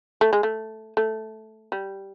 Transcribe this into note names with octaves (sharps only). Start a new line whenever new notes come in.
A3
G#3
A3
A3
G3